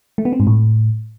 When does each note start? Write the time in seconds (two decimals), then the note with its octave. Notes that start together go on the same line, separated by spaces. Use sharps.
0.18 A3
0.25 B3
0.33 C4
0.40 G#2
0.47 A2